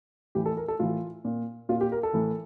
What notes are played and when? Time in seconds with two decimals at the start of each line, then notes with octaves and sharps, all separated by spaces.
0.35 A2 E3 G4
0.46 A4
0.57 A#4
0.68 A4
0.79 A2 E3 F4
1.25 A#2
1.69 A#2 F4
1.81 G4
1.92 A#4
2.03 A4
2.13 A2 E3